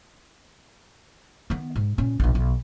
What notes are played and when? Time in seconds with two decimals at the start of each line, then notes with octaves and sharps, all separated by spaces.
1.50 D#3 B3
1.76 G#2
1.98 A#2 C#4
2.20 A#1 C3
2.35 B1